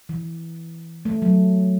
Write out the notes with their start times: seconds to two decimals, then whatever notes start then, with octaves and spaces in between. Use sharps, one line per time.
0.09 E3
1.05 A3
1.22 F#3